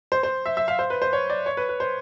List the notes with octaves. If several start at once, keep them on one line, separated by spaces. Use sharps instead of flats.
C5
C5
E5
E5
F5
C5
B4
C5
C#5
D5
C#5
B4
B4
C5